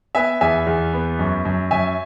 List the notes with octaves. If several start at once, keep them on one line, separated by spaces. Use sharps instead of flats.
B3 E5 G#5
E2 E5 G#5
E2
B3
F#2
F#2
F#2 E5 G#5